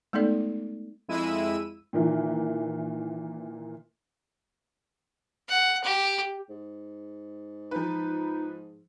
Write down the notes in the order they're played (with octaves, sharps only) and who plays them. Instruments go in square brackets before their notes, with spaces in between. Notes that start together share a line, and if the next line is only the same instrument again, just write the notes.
[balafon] G#3 A3 B3 D#4 A4 D5
[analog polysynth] F2 G#3 E4 E6 D#7
[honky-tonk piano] A#2 D#3 E3
[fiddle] F#5
G4
[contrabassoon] G#2
[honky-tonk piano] F3 B4 [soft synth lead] D#4